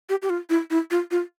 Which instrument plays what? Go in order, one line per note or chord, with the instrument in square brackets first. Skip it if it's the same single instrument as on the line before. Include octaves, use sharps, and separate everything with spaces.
[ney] G4
G4
F4
E4
E4
F4
F4